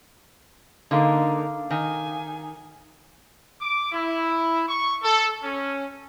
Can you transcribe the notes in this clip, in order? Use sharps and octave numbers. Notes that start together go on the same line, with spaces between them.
D3 A#3 D#4 A4 F5 D6
D#3 G#5
D6
E4
C#6
A4
C#4